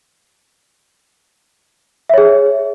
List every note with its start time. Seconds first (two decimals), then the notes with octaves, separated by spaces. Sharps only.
2.10 E5
2.14 C#5
2.18 G#4